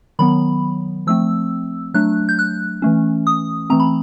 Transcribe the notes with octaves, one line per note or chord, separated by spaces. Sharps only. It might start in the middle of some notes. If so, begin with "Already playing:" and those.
D#3 F#3 B3 B5
F3 A3 C4 E6
F#3 A3 D4 F#6
G6
F#6
E3 A3 C#4
D#6
E3 A3 C4 A#5
B5